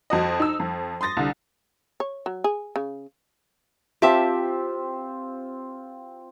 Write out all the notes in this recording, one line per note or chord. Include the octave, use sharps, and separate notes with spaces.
F2 F#4 D#5
D#4 E6
F2
C6 D#6 A6 A#6
C2 D3
C#5
F#3
G#4
C#3
C4 F4 G4 E5 A5